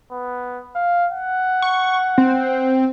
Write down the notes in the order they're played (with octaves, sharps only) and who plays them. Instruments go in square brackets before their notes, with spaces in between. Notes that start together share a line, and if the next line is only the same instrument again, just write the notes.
[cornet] B3
F5
F#5
[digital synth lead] C#6
C4